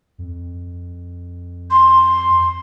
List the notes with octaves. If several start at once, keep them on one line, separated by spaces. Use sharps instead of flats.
F2
C6